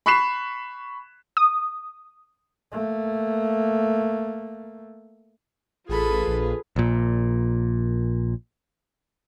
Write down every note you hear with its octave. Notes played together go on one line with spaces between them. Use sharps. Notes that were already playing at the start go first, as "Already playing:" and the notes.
B5 C#6 F#6 B6 C7 E7
D#6
A3 A#3
A1 F4 G#4 A4 B4 B5
A#1
A#1 A#2